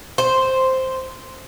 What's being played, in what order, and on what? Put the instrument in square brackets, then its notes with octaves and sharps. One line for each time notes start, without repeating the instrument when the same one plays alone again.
[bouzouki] C5